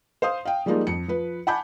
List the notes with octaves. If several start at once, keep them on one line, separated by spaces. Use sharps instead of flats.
C5 F5 C6 D#6
F5 G5
F3 G3 G#3 A#3 D#4 F4
F2 C#7
F3 B4
F#5 G#5 A5 B5 D6 G6